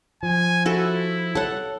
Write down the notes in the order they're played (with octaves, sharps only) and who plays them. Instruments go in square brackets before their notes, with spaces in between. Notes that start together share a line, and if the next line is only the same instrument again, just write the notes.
[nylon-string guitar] F3 [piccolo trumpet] G#5
[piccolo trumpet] E4 [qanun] F#4 A4
[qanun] A4 F#5 [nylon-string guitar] C#5 A5